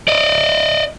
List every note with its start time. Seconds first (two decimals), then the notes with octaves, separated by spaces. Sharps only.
0.08 D5 D#5